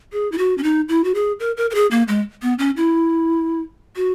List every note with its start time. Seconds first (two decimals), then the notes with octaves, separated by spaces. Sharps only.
0.12 G#4
0.32 E4
0.38 F#4
0.58 C#4
0.63 D#4
0.89 E4
1.04 F#4
1.15 G#4
1.40 A#4
1.57 A#4
1.70 A#4
1.75 G#4
1.91 A#3
2.08 G#3
2.42 B3
2.59 C#4
2.77 E4
3.96 F#4